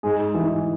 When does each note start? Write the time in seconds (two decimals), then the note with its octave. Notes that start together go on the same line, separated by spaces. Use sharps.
0.03 G#2 G#4
0.34 E3